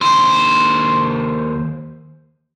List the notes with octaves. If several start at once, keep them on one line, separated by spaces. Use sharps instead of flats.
D#2 C5